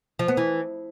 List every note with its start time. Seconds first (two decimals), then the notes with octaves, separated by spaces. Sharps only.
0.19 F3
0.28 B3
0.37 E3